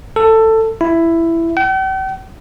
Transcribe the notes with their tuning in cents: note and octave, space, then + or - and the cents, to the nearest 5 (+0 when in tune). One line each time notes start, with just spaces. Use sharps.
A4 +15
E4 +10
G5 -45